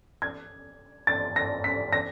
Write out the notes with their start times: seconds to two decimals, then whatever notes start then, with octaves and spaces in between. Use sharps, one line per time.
0.22 G#6
1.07 A6
1.36 A#6
1.64 B6
1.93 A#6